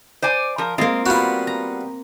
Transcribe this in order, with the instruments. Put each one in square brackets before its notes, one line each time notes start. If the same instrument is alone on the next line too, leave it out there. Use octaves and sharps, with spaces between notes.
[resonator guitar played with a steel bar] C5 D5 G#5
F3 A#4
[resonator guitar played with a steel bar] G#3 F4 [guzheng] A#3 C4
[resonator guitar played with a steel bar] G3 B3 [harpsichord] F4 F#4
[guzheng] A#5